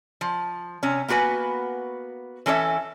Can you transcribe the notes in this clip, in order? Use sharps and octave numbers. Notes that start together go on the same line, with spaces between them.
F3
C3 C#4
A#3 B3 F#4 B4 G#5
E3 C#4 A4 C#5 E5